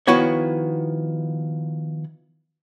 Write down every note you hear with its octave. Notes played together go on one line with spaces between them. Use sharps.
D#3 F3 B3 E4 F#4 C#5